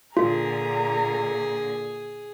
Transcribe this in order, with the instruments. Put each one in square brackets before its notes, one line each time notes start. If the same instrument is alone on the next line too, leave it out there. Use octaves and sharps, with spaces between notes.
[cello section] A#2 D3 [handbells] F4 [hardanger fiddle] G#4 [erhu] A#5